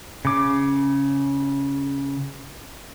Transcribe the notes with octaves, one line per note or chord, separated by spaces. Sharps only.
C#3 D6